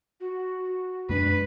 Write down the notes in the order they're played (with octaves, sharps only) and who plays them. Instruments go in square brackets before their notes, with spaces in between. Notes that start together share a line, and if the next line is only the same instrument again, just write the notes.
[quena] F#4
[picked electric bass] F#2 G#3 D4 [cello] B4